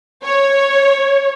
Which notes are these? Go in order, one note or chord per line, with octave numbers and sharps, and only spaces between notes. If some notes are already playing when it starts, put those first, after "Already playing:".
C#5